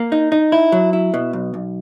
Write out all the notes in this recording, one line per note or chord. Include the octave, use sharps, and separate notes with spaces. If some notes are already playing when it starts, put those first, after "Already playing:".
Already playing: A#3
D#4
D#4
E4
F#3
E4
B2
B1
B1